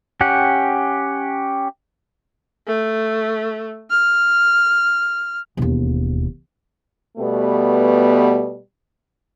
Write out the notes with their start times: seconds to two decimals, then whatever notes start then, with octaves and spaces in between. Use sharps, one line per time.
0.21 C#4 G4 F#5
2.67 A3
3.90 F6
5.57 E1 D#2
7.18 B2 G3 A3 B3